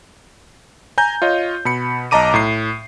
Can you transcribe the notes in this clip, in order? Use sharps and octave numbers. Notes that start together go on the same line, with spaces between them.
G#5 A#5 G6
F4 C#5 D#5
B2 B5 C#7
B1 D#5 A5 A#5 D6 D#7
A2 C7